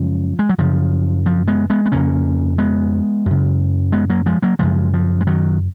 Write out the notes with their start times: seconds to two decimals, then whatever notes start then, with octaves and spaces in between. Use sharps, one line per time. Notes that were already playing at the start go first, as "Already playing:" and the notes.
Already playing: F#2 C#3 F3 G#3
0.39 G#3
0.49 F#3
0.58 F#2 C#3 F3
1.26 F3
1.48 G#3 B3
1.70 G#3 B3
1.86 B3
1.92 F2 C#3 A#3 C#4
2.58 G#3 B3
3.26 F#2 C#3
3.92 G#3 B3
4.10 F#3 A#3
4.26 F3 G#3
4.42 F#3 A#3
4.59 F#2 C#3 F3 G#3
4.94 F3
5.21 G#3
5.27 D#3 F#3